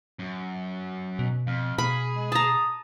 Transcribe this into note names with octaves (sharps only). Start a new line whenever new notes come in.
F#2
B2
F2 F5
B2 G#4 B5
G#3
A5 A#5 D#6